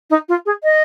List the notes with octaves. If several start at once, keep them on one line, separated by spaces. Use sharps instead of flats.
D#4
F4
G#4
D#5